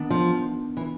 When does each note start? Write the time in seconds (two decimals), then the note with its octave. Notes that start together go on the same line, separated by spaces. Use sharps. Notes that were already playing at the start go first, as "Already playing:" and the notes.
Already playing: D#3 B3 D4
0.10 F3
0.77 E3